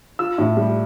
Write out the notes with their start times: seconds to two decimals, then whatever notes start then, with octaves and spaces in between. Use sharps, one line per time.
0.19 F4 E6
0.38 A2
0.57 G3